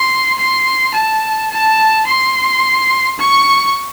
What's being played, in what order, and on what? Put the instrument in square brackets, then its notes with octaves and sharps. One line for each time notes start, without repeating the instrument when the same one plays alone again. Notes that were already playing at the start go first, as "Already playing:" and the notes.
Already playing: [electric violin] C6
C6
A5
A5
C6
C#6